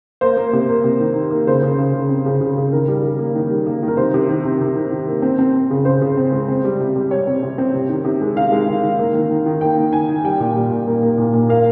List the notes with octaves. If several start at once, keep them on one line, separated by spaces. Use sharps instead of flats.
A#3 C5
A#3
C3
A#3
C3
D#3
D#3
A#3
C#3 C5
C#3
C#3
C#3
C4
C#3
C#3
C#3
D#3 A#4
G3
G3
A#3
D#3
G3
A#3
D#3
A#4
C3 C5
C3
D#3
C3
C3
D#3
D#3
A#3
C4
C4
C4
C#3
C#3 C5
C#3
C4
G#3
C4
G3
C3
C3
G3 C#5
C4
C3
C4
C3
D#3
C3
G#3
D#3 F5
G#3
D#3
D#3
A#3
D#3
D#3
D#3
A#3 G5
D#3
D#3 G#5
D#3
G3 G5
A#2
G3
A#2
A#3
A#3
A#2
A#2
A#3 F5